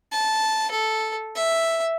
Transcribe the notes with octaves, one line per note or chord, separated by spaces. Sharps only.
A5
A4
E5